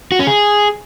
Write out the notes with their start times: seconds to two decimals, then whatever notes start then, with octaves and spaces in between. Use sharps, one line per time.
0.12 F#4
0.19 C#4
0.27 G#4